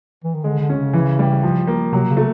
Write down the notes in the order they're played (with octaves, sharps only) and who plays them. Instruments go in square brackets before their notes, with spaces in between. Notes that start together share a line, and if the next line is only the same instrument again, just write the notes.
[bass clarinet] E3
D#3
[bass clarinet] D3 [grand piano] G#3
[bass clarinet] D3
[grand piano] C#4
[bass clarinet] C#3
[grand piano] E3
G3
F3
A#3
[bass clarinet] C3 [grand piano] F#3
[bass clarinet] C#3
[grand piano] A3